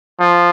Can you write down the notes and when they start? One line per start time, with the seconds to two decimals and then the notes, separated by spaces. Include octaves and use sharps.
0.20 F3